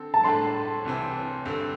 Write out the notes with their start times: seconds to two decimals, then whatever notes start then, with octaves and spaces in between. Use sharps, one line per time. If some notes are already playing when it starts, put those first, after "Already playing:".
Already playing: D3 C4 A4
0.14 A5
0.24 A2 A3 D4 A4 C6
0.85 C2 C3 E3 C4
1.45 G2 D3 C4